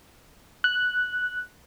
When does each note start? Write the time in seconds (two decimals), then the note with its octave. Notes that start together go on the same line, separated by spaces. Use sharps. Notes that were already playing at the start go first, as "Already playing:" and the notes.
0.64 F#6